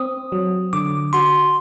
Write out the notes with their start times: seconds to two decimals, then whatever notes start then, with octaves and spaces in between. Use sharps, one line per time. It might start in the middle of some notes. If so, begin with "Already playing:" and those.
Already playing: C4 D#6
0.32 F#3
0.73 D3 D6
1.13 F#4 C6